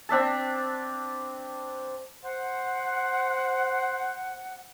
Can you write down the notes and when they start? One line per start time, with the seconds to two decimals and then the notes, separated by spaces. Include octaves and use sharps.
0.09 C4 D4 E5 A5
2.24 C5 F#5